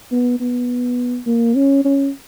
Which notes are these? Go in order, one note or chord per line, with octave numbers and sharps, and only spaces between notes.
B3
B3
A#3
C#4
C#4